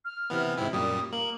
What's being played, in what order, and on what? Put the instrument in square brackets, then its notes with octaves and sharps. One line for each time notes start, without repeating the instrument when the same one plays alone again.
[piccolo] F6
[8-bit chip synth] C3 E3 B3
[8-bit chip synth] G#2 C3 E4 [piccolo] G5
[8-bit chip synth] F#2 A#2 G3 [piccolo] D#6
[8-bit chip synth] A#3 [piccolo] F#7